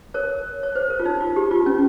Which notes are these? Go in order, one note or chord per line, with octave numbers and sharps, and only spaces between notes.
A#4 C#5
C#5
C5
A#4
F4
D#4
F4
G4
F4
C#4